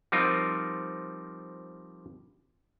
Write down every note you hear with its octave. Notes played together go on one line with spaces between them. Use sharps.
F3 G3 C4 D#4 F4 A#4